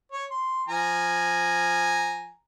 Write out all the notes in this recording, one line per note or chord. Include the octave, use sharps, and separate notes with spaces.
C#5
C6
F3 G#5 A#5